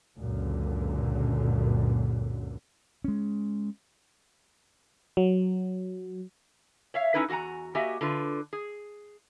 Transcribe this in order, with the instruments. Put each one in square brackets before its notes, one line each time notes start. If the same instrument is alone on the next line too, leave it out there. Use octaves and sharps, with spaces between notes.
[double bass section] C#2 F#2 A#2 D3
[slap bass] G#3 C#4
[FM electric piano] F#3
[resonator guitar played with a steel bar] C#5 E5 F5
C#4 D#4 E4 A4 B4
E2 F#4 F#5 G#5 A#5
A#3 F#4 G4 D#5 E5 G#5
D3 F4 B4
G#4